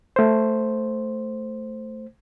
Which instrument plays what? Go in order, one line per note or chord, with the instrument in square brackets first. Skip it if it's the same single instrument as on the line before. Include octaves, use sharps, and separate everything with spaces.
[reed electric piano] A3 C5